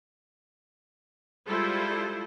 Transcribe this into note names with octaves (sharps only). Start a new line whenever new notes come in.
G3 G#3 E4 F4 A4 C5